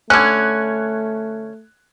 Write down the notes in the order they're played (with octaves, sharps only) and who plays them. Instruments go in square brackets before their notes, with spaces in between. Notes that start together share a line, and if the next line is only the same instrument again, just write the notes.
[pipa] D3 C#4 [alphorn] A3 [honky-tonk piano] F#6 G#6